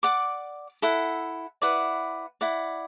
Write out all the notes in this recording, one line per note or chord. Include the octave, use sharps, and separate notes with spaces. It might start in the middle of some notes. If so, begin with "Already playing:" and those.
D5 F#5 D6
E4 A4 F#5
E4 B4 D5 F#5
E4 D5 F#5